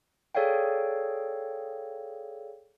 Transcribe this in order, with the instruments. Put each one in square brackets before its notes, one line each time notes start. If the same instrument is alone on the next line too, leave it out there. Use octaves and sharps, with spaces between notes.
[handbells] G#4 A4 C#5 D5 F5 G5